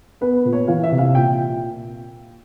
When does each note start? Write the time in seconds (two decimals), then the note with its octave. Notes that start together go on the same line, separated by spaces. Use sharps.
0.21 B3 B4
0.45 A#2
0.53 C#5
0.67 E3 F5
0.83 E5
0.92 C3
0.98 F5
1.14 A#2 G5